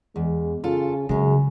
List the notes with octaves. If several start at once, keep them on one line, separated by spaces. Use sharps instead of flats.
E2 G#3
C#3 F4 A4
F#2 C#3 G#3 C#4